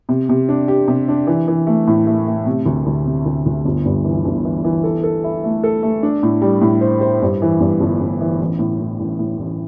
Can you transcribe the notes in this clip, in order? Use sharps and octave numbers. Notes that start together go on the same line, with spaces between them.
C3
C3
D4
G4
C3
D4
E3
E3
A3
A2
A3
A3
C3
D2
D2
C3
D2
D2
G1
G2
E3
G1
E3
E3
A4
A4
E4
A3
A4
A3
D4
A2
G3
A2
C5
C5
G2
E3
G2
G1
G1
E3
A1
A2
A2
A1
A2
A1